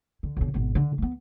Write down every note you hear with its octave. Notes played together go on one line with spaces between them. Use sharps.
D3
B1 D3
G#1 B2
D3
A3 B3